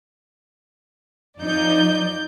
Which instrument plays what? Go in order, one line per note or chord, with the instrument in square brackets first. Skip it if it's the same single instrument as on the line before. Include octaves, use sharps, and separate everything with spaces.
[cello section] F2 F3 D#4 [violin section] D5 G6